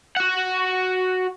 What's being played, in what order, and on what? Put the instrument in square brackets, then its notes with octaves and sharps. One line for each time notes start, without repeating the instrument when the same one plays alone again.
[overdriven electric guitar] F#4 F#5